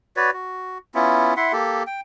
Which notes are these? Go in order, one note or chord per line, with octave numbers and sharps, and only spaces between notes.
F#4 B4 C#5 D5
F#4
B3 C#4 E4 F4
E4 E5 F#5 C6
A#3 G4 A4
G5